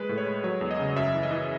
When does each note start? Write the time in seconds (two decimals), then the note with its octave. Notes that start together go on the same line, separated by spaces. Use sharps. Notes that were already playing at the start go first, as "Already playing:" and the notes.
Already playing: G#3 B4
0.09 A2
0.18 C#5
0.26 G#3
0.44 F#3 C#5
0.61 E2
0.71 D#5
0.79 C#3
0.96 F#2 E5
1.14 E3
1.23 D#5
1.31 E3